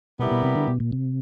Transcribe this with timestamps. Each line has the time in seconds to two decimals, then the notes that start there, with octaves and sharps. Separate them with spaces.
0.19 B2 G3 B3 E4 G4 A#4
0.31 B2
0.44 C3
0.56 D3
0.68 B2
0.80 A#2
0.92 C3